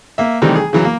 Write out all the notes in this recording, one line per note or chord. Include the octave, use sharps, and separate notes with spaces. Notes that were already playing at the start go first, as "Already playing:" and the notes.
A#3 E5
C3 D#3 E3 G3 A3
G#4
C#3 E3 F#3
A#3